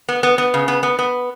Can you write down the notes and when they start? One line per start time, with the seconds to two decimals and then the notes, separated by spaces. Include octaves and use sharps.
0.09 B3
0.23 B3
0.38 B3
0.54 C#3
0.68 B3
0.83 B3
0.99 B3